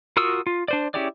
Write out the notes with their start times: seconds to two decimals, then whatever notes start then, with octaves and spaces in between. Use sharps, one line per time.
0.17 F4 F#4 A#4 D#6 E6
0.47 F4
0.68 D4 C5 D5
0.94 C#4 E4 G4 G#4 D5